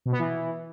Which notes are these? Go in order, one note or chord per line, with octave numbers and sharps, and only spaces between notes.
B2
B3
E3